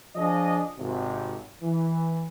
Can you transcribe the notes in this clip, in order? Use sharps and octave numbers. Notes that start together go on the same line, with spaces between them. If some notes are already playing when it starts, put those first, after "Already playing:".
F3 D4 G#4 D#5
G#1 C3
E3